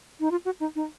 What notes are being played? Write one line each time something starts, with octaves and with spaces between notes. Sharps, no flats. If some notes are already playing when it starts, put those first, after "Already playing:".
D#4
F4
F#4
D#4
D#4